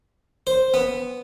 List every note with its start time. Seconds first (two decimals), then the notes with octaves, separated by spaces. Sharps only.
0.47 C5
0.74 B3